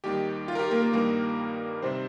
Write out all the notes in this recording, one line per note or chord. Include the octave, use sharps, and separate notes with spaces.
D#2 D#3 G3 G4
F4
A#4
G4
A#3 A#4
A#3 A#4
G2 D#3 G3 A#3 A#4
C3 D#3 G3 C4 C5